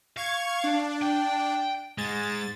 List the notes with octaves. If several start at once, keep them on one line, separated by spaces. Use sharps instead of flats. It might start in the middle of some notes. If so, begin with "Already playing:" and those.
F5 C#6 G#6
D4
G5
G#2 G#3 A6